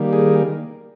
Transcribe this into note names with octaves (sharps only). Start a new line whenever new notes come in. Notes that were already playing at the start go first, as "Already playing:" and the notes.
Already playing: D#3 G3 A#3
G#4